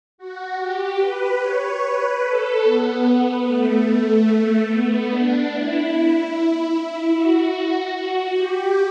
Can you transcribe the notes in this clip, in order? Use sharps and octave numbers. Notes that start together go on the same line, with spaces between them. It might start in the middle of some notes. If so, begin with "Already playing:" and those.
F#4
G4
B4
C#5
B4
A4
B3
A3
A3
B3
D4
E4
F#4
G4